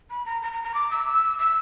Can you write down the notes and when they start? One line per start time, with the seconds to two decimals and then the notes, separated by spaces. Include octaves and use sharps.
0.10 B5
0.26 A#5
0.42 A#5
0.53 A#5
0.64 A#5
0.74 D6
0.91 E6
1.39 E6